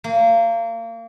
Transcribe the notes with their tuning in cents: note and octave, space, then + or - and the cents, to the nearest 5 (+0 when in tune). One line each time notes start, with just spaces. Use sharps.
A#3 -30